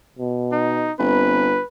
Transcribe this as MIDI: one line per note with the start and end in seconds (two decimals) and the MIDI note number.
0.19 0.90 47
0.52 0.92 63
1.00 1.57 31
1.00 1.47 60
1.00 1.65 71